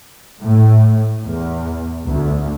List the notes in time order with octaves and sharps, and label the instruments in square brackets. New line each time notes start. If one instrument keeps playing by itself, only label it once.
[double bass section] A2
E2
D2